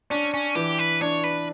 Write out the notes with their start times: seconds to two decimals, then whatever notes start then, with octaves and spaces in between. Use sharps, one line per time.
0.10 C#4 D4
0.34 C#4
0.55 E3 G4
0.79 B4
1.01 D4 C#5
1.24 B4